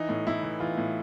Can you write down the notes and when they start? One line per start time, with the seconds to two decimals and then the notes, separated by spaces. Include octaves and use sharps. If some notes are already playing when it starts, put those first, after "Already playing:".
Already playing: E3 D#4
0.09 A2
0.27 A2 E4
0.43 E3
0.60 E3 F4
0.77 A2